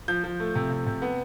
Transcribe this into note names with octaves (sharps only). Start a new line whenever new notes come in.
F3 G6
F3
A3
C3
C3
C3
B3